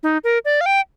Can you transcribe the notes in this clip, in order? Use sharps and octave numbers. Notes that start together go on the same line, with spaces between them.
D#4
A#4
D5
F5
G5